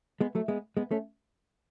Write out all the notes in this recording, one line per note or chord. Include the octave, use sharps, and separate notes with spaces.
G#3 B3
F#3 A3
G#3 B3
G#3 B3
A3 C#4